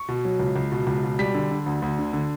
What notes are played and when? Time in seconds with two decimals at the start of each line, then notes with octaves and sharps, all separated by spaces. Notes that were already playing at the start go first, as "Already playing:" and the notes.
Already playing: C#6
0.09 B2
0.25 F#3
0.40 C#2
0.56 C#2
0.72 B2
0.87 C#2
1.03 B2
1.19 G3 B6
1.34 D3
1.51 D3
1.66 D2
1.82 D2
1.99 D3
2.13 D3